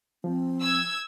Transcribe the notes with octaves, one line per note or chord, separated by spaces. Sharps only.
F3 C4
E6 G#6